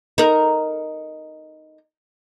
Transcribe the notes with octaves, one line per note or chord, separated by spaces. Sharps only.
D#4 A#4